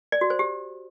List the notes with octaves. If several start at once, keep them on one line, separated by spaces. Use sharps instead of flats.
D5
F#4
C5
G4